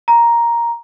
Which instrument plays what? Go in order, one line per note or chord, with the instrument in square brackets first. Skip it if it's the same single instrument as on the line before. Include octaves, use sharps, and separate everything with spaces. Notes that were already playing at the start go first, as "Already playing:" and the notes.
[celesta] A#5